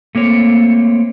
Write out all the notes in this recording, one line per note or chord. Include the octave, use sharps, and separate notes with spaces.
A3 A#3 C4 C#5